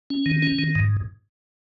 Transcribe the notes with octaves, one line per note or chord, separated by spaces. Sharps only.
C#4
D#3
C#4
D#3
G#2